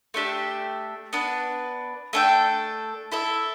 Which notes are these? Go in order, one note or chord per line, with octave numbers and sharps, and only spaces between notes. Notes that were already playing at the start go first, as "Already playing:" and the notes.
A3 D4 G4 E5
B3 D4 B4
A3 D4 A4 G5
E4 A4 E5